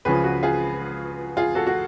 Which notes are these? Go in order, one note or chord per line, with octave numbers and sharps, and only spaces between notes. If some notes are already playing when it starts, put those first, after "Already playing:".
C#2 C#3 F3 G#4 B4
F#4
F4 G#4
F4 G#4
F#4 A4
F#4